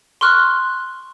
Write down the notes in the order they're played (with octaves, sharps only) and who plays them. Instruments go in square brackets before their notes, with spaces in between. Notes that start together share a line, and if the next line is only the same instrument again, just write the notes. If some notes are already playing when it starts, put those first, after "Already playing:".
[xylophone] C6 C#6 F6 F#6